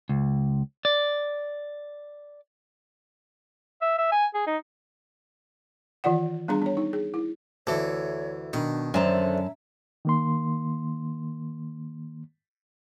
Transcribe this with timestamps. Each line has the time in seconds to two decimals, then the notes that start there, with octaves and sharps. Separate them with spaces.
0.09 C#2
0.85 D5
3.81 E5
3.98 E5
4.12 G#5
4.34 G#4
4.47 D#4
6.04 D#3 E3 F4 D5 F#5
6.48 G3 B3 D4 G#4 A#5
6.62 B3 C#5
6.77 D#4
6.93 G#4
7.14 E4
7.67 D2 E3 A4 C#5
8.53 B2 D#3 D4
8.94 F#2 D3 C5 E5 A5 A#5
10.05 D#3 A#3 C6